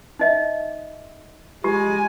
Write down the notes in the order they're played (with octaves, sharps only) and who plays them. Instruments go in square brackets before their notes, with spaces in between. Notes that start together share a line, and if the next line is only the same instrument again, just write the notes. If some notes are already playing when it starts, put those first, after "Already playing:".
[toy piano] D#4 D#5 E5
[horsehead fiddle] G#3 G#5 [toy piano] F4 G4